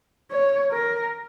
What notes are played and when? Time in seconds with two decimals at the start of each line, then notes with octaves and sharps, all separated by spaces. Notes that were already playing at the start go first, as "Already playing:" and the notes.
0.31 C#5
0.72 A#4